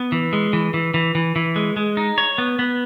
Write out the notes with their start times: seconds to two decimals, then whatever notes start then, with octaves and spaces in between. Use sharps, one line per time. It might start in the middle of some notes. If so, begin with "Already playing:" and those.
Already playing: B3
0.12 E3
0.33 G#3
0.53 E3
0.74 E3
0.94 E3
1.15 E3
1.36 E3
1.56 G#3
1.77 G#3
1.97 D#4
2.18 C#5
2.38 B3
2.59 B3